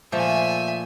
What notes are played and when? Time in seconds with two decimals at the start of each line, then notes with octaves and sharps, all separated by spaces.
0.12 A#2 F3 A3 E5 G#5